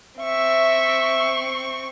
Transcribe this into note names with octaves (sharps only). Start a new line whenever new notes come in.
C4 E5 C#6